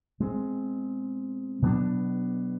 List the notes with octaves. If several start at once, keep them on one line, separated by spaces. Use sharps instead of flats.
B2 G#3 C4
B2 F#3 B3 D4